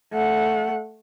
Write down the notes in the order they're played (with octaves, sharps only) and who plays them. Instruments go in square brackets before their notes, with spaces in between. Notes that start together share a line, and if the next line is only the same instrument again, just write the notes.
[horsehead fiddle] A3 F#5